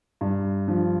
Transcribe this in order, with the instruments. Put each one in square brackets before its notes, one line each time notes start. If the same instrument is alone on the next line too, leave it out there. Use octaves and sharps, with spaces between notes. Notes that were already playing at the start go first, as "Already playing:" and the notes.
[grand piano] G2
F3